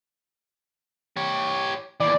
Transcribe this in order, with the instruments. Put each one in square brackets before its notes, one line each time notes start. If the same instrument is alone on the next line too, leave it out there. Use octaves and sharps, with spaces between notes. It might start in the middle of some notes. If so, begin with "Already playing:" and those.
[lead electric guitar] G4 C#5
[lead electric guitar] D#2 E3 [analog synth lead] D5